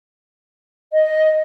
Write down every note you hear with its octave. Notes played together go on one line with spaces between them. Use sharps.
D#5